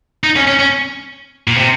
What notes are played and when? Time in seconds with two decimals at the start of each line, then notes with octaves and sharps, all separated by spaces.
0.24 D#4
0.36 C#4
0.48 C#4
0.59 C#4
1.48 A#2
1.57 C3